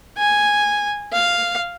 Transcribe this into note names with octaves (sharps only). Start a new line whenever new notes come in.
G#5
F5